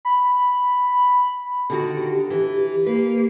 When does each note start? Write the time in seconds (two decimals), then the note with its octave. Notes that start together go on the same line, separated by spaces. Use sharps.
0.05 B5
1.70 D3 D#3 F#4 G4
2.30 E3
2.86 A#3 B4